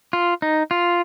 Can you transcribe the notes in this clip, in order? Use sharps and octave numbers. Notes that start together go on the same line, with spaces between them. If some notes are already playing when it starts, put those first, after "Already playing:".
F4
D#4
F4